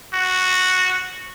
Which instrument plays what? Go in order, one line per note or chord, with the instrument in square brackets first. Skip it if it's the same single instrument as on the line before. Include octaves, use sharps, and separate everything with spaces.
[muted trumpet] F#4